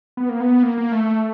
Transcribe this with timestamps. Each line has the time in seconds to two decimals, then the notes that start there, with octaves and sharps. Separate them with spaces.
0.17 B3
0.29 A#3
0.40 B3
0.63 A#3
0.78 A#3
0.92 A3